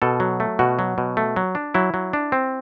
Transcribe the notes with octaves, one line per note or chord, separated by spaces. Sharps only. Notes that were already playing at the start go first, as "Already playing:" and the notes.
B2 A4
F#3
A3
B2 F#4
F#3
B2
A3
F#3
D4
F#3 E4
F#3
D4
C4